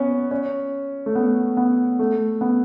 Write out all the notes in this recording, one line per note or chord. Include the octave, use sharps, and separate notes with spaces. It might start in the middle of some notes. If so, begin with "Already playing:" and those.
Already playing: B3 C#4
C#4
A3
B3
B3
A3
B3